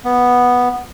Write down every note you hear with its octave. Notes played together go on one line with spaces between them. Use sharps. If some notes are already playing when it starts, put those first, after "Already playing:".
B3